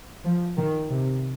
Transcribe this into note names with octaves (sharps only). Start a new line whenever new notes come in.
F3
D#3
C3